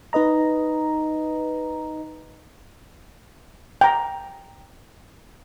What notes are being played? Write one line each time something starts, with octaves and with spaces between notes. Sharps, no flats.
D#4 B4 D#5 A#5
G5 A#5